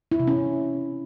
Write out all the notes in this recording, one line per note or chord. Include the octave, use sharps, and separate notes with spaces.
E4
C3
C#4